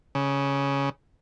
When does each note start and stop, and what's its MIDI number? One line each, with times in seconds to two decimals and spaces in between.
0.15 0.89 49